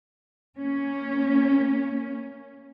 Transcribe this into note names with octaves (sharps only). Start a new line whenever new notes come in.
A#3 C#4